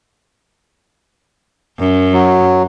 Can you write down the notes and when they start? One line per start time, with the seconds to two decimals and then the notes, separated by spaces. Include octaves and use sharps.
1.79 F#2
2.13 F#3